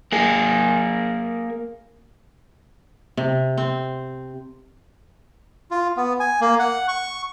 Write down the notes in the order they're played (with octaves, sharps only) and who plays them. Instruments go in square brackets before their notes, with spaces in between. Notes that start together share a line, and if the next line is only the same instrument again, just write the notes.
[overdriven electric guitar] A#3 G#4
[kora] C3
C4
[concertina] F4
B3
G#5
A#3
F#5
C#6